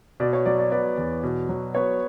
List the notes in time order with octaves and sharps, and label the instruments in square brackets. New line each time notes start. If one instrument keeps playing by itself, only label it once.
[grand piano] B2 [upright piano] D5
[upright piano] C#5
[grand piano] F#3 [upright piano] D5
[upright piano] D5
[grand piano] B3 [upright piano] D5
[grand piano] E2
B2
F#3
[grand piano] B3 [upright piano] C#5